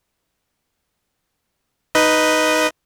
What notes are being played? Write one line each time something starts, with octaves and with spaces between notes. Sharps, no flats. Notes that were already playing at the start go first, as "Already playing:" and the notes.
D#4 B4 D#5